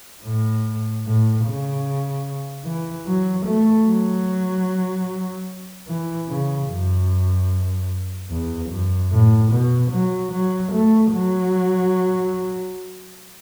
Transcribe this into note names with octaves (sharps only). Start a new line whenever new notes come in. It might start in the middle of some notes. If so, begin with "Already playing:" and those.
A2
A2
C#3
E3
F#3
A3
F#3
E3
C#3
F#2
E2
F#2
A2
B2
F#3
F#3
A3
F#3